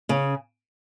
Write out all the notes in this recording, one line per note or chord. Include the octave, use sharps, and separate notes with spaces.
C#3 C#4